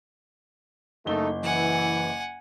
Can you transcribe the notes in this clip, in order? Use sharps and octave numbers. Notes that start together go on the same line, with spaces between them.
F#1 A3 A#3 D#4 G7
E3 F#5 G#5